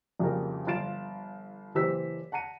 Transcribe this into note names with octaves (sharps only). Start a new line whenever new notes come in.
A#1 F2 C#3 G3 F#4 A#4
G1 F3 F4 A6 D7 E7
F#1 E3 G4 C5 E6 B6
F#5 A5 A#5 C#7 D#7